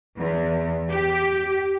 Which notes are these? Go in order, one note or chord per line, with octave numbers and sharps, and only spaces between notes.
E2
G4